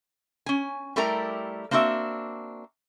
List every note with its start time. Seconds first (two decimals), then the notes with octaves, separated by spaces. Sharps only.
0.46 C#4 G#5
0.96 G3 A3 E4 G4 A#4 A#5
1.71 A#3 C4 D4 F#4 E5